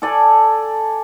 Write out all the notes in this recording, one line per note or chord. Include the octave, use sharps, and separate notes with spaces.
A4 D5 G#5